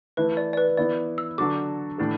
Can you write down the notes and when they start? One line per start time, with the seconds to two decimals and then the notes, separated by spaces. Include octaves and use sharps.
0.17 E3 A3 E4 B4
0.37 D5
0.53 D5
0.57 B4
0.77 E3 B3 E4 D5
1.18 E6
1.38 D3 F#3 D4 F#4 A4 D6
1.98 A2 E3 D4 A4